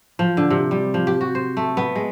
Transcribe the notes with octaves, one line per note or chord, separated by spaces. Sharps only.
F3
D3
C3
G3
F3
G4
F#4
C5
A3
B3
G#3